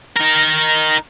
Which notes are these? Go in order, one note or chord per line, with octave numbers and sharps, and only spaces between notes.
D#4 A#4